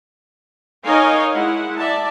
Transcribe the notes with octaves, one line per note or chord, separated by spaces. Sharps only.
D#4 A#4 C#5 D#5 F5 G#5
G#3 E4 F#5
D5 E5 A5